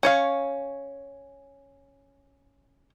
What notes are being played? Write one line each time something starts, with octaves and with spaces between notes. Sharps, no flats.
C#4 C#5 F5